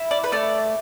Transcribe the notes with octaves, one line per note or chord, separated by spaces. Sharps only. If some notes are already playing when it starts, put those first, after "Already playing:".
Already playing: E4
D5
B4
A3 D5